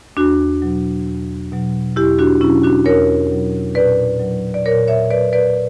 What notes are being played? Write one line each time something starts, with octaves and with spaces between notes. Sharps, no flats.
E2 D4 F#4
B2 F#3
E2
B2 F#3
E2 E4 G4
D4 F#4
B2 F#3 C#4 E4
D4 F#4
E2 A#4 C#5
B2 F#3
A#2 B4 D5
F#3
D5
A#2 A#4 C#5
C#5 E5
F#3 B4 D5
B4 D5